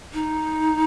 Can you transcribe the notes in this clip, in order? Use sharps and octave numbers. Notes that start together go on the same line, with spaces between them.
D#4